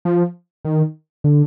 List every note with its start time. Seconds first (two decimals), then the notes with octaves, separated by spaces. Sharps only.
0.05 F3
0.65 D#3
1.24 D3